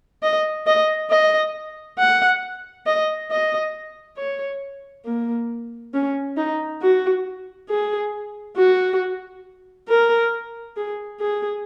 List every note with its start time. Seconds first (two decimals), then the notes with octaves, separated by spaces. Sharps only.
0.23 D#5
0.67 D#5
1.10 D#5
1.99 F#5
2.86 D#5
3.31 D#5
4.17 C#5
5.05 A#3
5.94 C#4
6.37 D#4
6.82 F#4
7.70 G#4
8.57 F#4
9.89 A#4
10.77 G#4
11.20 G#4